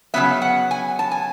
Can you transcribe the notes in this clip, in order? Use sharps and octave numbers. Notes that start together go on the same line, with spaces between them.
C#3 F#3 B3 E5
F#5
G#5
A5
G#5